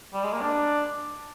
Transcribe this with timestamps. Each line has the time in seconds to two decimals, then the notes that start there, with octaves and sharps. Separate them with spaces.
0.13 G3
0.23 G#3
0.33 A#3
0.41 D4